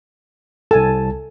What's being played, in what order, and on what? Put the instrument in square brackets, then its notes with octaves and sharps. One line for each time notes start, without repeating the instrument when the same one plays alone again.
[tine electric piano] C2 A5 [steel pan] A4 G#5